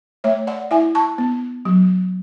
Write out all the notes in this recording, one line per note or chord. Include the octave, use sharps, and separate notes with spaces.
A3 C#5 E5
D5 F#5
E4 E5 G#5
A5 C#6
B3
F#3